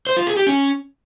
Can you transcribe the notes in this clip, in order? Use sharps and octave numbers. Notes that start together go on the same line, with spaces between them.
C5
F4
G#4
G4
C#4